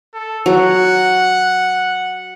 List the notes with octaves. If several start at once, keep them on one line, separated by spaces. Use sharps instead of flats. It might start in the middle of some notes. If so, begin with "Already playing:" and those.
A4
F#3 F#5